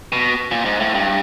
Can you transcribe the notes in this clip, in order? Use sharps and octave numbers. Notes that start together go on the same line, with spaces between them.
B2
A#2
G#2
A2
G2